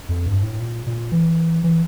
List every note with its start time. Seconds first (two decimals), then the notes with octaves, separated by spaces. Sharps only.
0.09 F2
0.26 G2
0.43 A2
0.60 A#2
0.87 A#2
1.12 E3
1.64 E3